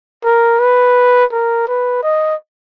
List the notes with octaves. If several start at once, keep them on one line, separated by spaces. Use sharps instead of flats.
A#4
B4
A#4
B4
D#5